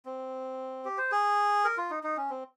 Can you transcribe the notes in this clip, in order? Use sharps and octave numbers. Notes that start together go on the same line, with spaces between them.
C4
G4
C5
G#4
A#4
F4
D#4
D#4
C#4
C4